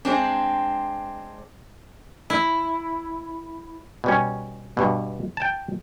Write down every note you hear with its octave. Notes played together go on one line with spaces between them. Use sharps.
G#3 C4 D4
E4
B2 G3 C#4
G2 B2
G5 A5